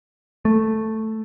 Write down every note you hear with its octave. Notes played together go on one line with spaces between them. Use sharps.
A3